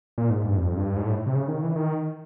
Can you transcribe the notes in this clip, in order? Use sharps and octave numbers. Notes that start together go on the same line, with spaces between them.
A#2
G#2
G2
F2
G2
G#2
A2
C3
C#3
D#3
E3
D#3